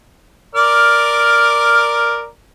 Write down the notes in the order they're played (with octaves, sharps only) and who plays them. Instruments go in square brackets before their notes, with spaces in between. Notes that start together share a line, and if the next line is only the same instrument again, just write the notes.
[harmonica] A#4 D5 F6